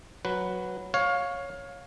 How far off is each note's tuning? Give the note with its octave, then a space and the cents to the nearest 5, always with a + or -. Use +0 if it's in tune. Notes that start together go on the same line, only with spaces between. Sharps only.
F#3 -5 B4 +0
C#5 +0 F5 +20